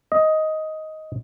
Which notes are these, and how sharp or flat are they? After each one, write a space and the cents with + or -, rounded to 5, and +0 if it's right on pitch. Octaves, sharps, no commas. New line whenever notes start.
D#5 +10